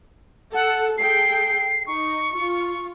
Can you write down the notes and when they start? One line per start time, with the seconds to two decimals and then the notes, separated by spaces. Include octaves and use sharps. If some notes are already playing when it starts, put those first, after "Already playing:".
0.54 A4 F#5
0.98 G#4 A4 G5 C7
1.87 D#4 C#6
2.35 F4